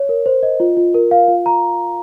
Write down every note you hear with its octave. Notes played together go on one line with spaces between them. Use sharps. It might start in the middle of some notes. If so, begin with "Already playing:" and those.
Already playing: C#5
A#4
C5
D#5
F4
F4
A#4
F5
F4
A#5